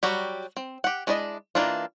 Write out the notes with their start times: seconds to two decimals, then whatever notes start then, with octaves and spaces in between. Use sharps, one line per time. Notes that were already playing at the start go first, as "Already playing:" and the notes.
0.03 F#3 G3 F#4 G4
0.57 C4
0.84 G4 F#5
1.07 G#3 D4 E4 D5 D#5
1.55 E3 A#3 D4 D#4 F4